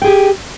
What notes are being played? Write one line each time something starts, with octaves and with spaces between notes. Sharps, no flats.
G4 G#4 G5